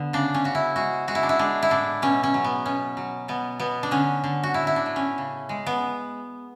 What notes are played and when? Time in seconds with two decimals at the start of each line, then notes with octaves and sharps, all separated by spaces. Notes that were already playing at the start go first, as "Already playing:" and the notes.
Already playing: D3 B3
0.13 C#3 D4
0.34 C#4
0.44 C#3 F#4
0.55 E4
0.76 G#3 F#4
1.08 G#3 F#4
1.15 E4
1.23 D4
1.29 E4
1.39 G#3 D4
1.63 E4
1.70 A2 D4
2.02 B2 C#4
2.23 C#4
2.34 F#3
2.44 B3
2.65 B2 C#4
2.97 F#3
3.28 B2 B3
3.60 B2 B3
3.83 D4
3.91 D3 C#4
4.24 D3
4.43 F#4
4.54 A2 E4
4.67 E4
4.76 D4
4.86 A3
4.96 C#4
5.18 C#3
5.49 G#3
5.66 B3